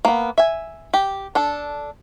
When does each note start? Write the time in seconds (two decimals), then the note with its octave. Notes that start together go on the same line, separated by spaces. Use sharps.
0.05 A#3 B3
0.38 E5 G#5
0.94 G4
1.35 D4 A4